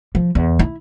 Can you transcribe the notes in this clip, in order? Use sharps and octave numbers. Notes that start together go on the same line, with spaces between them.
F3
E2
E4